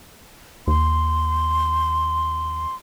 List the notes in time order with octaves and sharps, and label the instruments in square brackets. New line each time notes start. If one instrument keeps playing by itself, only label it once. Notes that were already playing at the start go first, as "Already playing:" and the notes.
[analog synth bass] D#2 [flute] C6